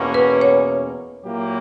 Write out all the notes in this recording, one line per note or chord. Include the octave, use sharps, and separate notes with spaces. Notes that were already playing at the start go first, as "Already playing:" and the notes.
Already playing: E2 B2 A#3 C#4
B4
C#5
A#2 F#3 A#3 E4 G4